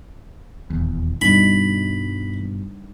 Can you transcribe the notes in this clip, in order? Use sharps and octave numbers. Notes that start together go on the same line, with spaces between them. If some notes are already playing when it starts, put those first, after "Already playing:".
D#1 E2
G2 B2 G3 D4 D#4 B5